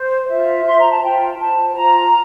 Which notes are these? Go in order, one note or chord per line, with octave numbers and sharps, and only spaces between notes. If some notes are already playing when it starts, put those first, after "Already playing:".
Already playing: C5
F4 E5
C5 C6
A#5
A5
F4 G5
C5 A5
F4 A#5